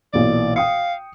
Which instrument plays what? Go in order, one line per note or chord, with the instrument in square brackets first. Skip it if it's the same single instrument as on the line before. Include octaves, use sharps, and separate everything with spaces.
[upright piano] B1 A#2 E3 [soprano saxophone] D5
[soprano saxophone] F5 [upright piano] G5 D#6 C#7